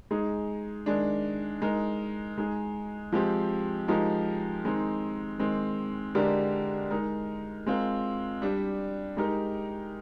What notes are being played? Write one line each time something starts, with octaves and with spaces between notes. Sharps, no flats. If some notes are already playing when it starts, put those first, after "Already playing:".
G#3 D#4 G#4
D#3 G#3 D4
G#3 D#4 A#4
G#3 D#4 G#4
F3 G#3 C4 G4
F3 G#3 D#4 G4 A#4
D#3 G#3 C4 D#4
D#3 G#3 C4
D3 G#3 D4 G4 A#4
G#3 D#4 A#4
G#3 C4 F4 A#4
G3 D4 G4
G#3 D#4 G4 A#4